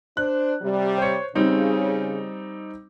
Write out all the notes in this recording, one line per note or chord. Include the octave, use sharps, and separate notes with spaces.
D4 C5 F#6
C3 G3
C5 C#5
C#3 G3 C4 D#4